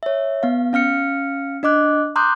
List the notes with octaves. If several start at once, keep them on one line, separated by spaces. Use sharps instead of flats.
C#5 E5
B3 F5
C#4 F5 F6 C#7
D4 D#5 D6 F#6
A#5 C6 D6 D#6 F#6 G6